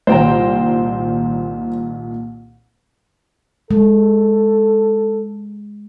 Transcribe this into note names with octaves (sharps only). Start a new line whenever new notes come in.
C2 A#2 D#3 C5 G5 A#5
G#3 A4